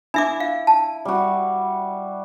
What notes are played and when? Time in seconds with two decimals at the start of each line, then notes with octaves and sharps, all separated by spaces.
0.14 D4 E4 E5 D6
0.40 F5
0.67 A5
1.05 G3 F#4